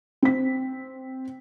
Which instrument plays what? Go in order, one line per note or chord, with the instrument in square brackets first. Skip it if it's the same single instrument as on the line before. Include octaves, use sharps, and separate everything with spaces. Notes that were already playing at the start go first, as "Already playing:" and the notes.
[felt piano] C4 B6